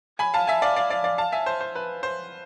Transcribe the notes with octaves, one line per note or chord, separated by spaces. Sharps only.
G#5 B5
F5 A5
E5 G#5
D5 F5
D5 F5
D5 F5
D5 F5
F5 A5
E5 G#5
C5
C5
B4
C5